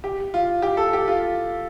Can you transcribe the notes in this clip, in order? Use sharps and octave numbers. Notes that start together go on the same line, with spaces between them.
G4
F4
G4
A4
G4
F4